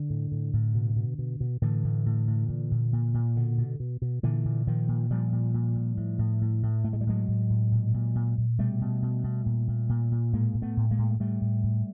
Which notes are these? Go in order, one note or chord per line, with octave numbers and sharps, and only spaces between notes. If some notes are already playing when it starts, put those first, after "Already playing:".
Already playing: D3
A2
A2
A2
B2
B2
B2
B2
A2 D3 E3
A2
A2
A2
A#2
A#2
A#2
A#2
B2 D3
B2
B2
B2
A#2 D3 E3
A#2
A#2 D#3 F3
A#2
A#2 F3 G3
A#2
A#2
A#2
A2
A2
A2
A2
A2 A3
G#3
G3
A2 F#3 G#3
A2
A2
A#2
A#2
A#2
A#2
B2 G3 A3
B2
B2
B2
A#2
A#2
A#2
A#2
A2 G#3 A#3
A2
A3 B3
A2
G#3 A#3
A2
A2 G3 A3
A2
A2